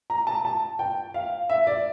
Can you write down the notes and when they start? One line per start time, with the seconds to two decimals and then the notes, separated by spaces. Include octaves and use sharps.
0.10 A#5
0.27 A5
0.45 A5
0.79 G5
1.14 F5
1.50 E5
1.67 D5